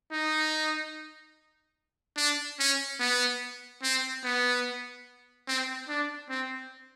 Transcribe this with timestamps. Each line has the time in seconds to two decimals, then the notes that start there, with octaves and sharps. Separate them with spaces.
0.12 D#4
2.17 D4
2.59 C#4
3.00 B3
3.83 C4
4.24 B3
5.48 C4
5.89 D4
6.29 C4